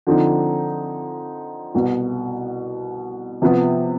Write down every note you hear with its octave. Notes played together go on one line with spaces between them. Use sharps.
D3 F3 C4 D#4
C2 B2 B3
C3 F3 B3